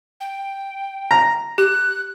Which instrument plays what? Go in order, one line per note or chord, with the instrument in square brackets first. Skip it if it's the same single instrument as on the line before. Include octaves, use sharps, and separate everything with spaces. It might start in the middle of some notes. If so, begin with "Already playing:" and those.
[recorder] G5
[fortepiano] A#5
[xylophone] G4 [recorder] F#6